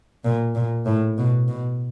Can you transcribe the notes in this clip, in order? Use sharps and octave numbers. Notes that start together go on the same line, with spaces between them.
A#2
A#2
A2
B2
B2